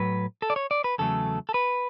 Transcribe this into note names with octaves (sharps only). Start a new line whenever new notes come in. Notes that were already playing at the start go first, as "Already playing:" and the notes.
Already playing: A2 F#3 B4
A4
D5
C#5
D5
B4
E2 C#3 F#3 A3 A4
A4
B4